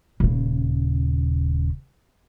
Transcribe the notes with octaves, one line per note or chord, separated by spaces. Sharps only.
D#1 C#3